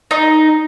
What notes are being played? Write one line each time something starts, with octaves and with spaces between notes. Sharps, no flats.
D#4